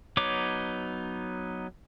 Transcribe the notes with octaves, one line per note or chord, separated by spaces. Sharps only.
F#3 B3 D#4 C#5 D6